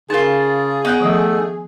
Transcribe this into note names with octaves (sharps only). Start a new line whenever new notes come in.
C#3 D#4 F4 G#4 A#4 A5
B3 D#4 F#5 G5
D#3 F3 A3 D#5